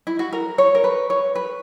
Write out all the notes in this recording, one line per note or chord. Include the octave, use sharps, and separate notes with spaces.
E4
F#4
A#4
C#5
A#4
B4
C#5
B4